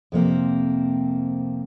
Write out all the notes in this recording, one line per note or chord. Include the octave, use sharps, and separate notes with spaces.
F2 C3 A#3 C4